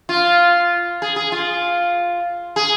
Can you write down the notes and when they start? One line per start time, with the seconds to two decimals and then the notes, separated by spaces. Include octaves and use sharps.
0.09 F4
1.02 G#4
1.16 G#4
1.32 F4
2.56 G#4